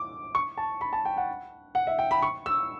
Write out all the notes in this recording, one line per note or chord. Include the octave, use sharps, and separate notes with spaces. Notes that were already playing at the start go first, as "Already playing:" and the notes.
Already playing: D6
C#6
A5
B5
A5
G5
F#5
F#5
E5
G5
B5
C#6
E6